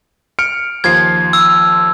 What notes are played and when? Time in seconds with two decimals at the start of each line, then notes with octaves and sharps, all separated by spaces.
0.39 F6 C#7 D7
0.84 D#2 F3 G#6 C7
1.33 E6